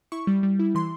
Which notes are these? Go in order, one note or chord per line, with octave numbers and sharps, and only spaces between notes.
E4 C#6
G3
G3
E4
E3 C6